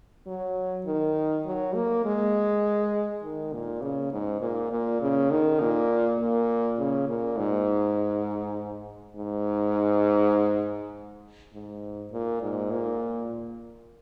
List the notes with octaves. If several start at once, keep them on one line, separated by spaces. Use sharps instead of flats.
F#3
D#3
F#3
A#3
G#3
D#3
A#2
C#3
G#2
A#2
A#2
C#3
D#3
A#2
A#2
C#3
A#2
G#2
G#2
G#2
A#2
G#2
A#2